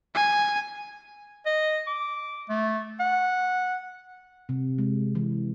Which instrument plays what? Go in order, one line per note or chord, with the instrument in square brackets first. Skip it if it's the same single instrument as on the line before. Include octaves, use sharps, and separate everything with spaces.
[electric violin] G#5
[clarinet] D#5
D6
A3
F#5
[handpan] C3
G#3
E3